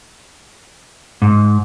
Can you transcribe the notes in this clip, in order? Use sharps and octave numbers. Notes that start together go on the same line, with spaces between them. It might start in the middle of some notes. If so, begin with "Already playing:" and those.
G#2